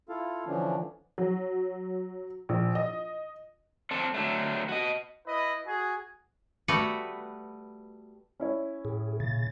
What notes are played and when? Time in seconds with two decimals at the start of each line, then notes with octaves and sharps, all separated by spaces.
0.09 E4 F4 A4 F5
0.46 D3 E3 F3 C#4 D4
1.18 F#3
2.49 A#1
2.75 D#5
3.91 C4 D4 A4
4.14 D3 F#3 A3
4.68 F#4 D#5
5.26 E4 B4 D#5
5.66 F#4 G#4
6.68 G3 A3 B3 F#4 B4
8.40 C#4 E4 C#5
8.85 A2 G#4
9.20 A#2 C#3 A6